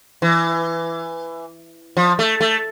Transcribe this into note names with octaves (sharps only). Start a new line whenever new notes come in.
E3
F3
A3
A3